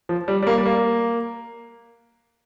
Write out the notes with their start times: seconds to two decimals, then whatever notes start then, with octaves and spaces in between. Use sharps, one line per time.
0.09 F3
0.28 G3
0.42 G3
0.47 A#3
0.58 G3
0.66 A#3